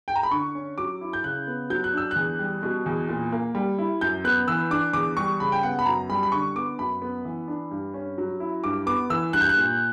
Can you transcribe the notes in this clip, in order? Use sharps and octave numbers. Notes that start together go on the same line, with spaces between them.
G5
A#5
B5
D3 C#6
C#4
F#3 D6
E4
G6
C#3 F#6
B3
F#3 G6
F#6
D4 E6
E2 F#6
G3
B2
E2
A#2
A#3
G3
E4
F#2 G6
B3 F#6
E3 E6
D4 D6
E2 D6
G3 C#6
C#3 B5
G5
B3 F#5
B5
F#2 A#5
G3 B5
B5
D3 C#6
B3 D6
F#2 B5
B3
E3
D4
G2
C#4
F#3
E4
G2 D6
B3 D6
E3 E6
G2 F#6
G6
F#6
A#2